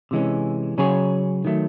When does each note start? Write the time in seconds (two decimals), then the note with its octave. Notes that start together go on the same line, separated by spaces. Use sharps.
0.11 C3 E3 G#3 C#4
0.78 C#3 F#3 C#4 G#4 C#5
1.45 D#3 F#3 A3